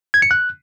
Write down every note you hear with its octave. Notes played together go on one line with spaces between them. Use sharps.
G#6
C#7
F#6